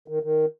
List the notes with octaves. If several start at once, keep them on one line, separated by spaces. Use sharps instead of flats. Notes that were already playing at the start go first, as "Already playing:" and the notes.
D#3
D#3